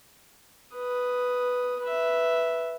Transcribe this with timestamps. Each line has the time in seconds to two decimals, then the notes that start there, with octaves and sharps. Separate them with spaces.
0.75 B4 D#6
1.81 B4 E5